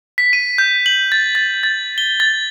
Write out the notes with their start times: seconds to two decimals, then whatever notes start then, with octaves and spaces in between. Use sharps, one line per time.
0.18 B6
0.33 D#7
0.58 G6
0.86 F#7
1.12 A6
1.35 A6
1.63 A6
1.98 G7
2.20 A6